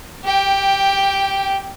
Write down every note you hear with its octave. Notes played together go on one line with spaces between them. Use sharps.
G4 G5